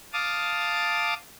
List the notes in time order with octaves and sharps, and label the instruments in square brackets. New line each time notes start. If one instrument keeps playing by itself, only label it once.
[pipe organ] F5 A5 D6 D#6